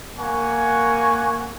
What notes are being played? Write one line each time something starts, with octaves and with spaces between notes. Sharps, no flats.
A#3 F#5 G#5 C#6